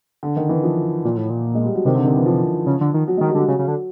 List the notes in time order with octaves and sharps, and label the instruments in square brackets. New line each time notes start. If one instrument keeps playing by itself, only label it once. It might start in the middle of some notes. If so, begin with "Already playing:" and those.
[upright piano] D3
D#3
E3
F3
[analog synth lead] A#2
A2
A#2
[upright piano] G#3
G3
F#3
[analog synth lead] C3 [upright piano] D#3
[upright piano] D3
D#3
E3
F3
[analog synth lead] C#3
D3
D#3
[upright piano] F#3
G#3
[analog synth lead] D#3
[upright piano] G3
[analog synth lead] D3 [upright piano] F#3
[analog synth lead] C#3
C#3
D3